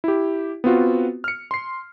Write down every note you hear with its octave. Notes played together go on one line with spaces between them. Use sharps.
E4 G4
B3 C4 F4 F#4
F6 C#7
C6 C7